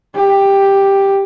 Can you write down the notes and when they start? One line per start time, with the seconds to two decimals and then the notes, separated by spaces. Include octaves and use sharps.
0.16 G4